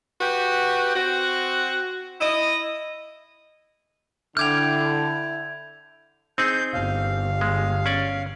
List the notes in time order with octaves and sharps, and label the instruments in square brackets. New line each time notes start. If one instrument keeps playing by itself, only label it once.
[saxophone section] F#4 G4 B4
C4 F#4
E4 D#5
[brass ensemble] D3 [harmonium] E4 [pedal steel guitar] G5 D6 F6 [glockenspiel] G6 G#6 F7
[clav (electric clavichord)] C4 D#4 G#4 [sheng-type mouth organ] G6
[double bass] G1 [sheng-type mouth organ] F5
[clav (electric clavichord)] G#3
C#4 D5